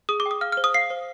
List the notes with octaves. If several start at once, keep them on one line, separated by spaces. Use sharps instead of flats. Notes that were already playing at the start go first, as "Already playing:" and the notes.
G#4 D#6
D6
G5
D#6
F5 F6
F6
C5
D#6
F5 C7
C5